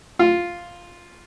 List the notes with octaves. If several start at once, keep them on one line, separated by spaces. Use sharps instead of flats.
F4